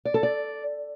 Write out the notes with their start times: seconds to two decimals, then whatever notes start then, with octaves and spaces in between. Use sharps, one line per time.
0.05 D5
0.14 A4
0.23 D5